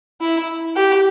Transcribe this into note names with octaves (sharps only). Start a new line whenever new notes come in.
E4
G4